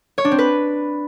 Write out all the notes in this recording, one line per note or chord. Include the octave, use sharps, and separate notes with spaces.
C#5
D4
C4
B4